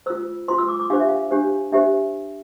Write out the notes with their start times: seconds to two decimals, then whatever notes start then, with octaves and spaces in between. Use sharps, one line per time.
0.06 F4 C5 E6
0.48 F4 C5 C6
0.58 E6
0.68 D6
0.80 D6
0.90 D4 G4 C5 F5
1.00 E5
1.09 F5
1.31 D4 G4 C5
1.72 D4 G4 C5 E5